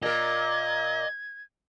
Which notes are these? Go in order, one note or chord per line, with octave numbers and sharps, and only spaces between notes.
A#2 A#4 D#5 G#6